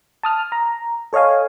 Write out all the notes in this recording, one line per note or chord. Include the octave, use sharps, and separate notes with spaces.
A5 D#6 F6
A#5
A4 C#5 D#5 F5 G#5